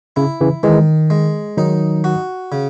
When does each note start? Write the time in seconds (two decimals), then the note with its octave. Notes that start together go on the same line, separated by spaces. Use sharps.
0.16 C#3 E4
0.41 C#3 E3
0.63 D#3 E3 G#3
1.10 G#3
1.57 D#3 F#3 D#4
2.04 F#4
2.52 C#3